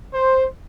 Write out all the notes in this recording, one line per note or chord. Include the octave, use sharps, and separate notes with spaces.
C5